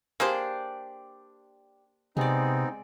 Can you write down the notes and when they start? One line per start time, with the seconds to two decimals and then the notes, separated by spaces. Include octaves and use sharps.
0.20 A#3 D4 G4 G#4 C5 D5
2.17 C3 G#3 B3 C4 D#4 D5